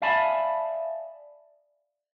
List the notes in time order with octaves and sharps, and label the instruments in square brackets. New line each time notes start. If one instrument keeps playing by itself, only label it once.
[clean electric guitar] D5 E5 F5 G#5 A5 B5